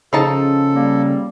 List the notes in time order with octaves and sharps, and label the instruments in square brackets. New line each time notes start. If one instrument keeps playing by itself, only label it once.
[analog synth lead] C#3 [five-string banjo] F3 D#4 A5 [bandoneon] A4
[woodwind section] G3 A#3